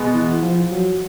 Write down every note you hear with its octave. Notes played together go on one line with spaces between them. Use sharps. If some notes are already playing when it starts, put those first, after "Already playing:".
Already playing: B2 G#3 B3
E3
F3
F#3